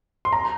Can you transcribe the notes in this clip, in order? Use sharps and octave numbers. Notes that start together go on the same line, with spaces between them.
C6
A#5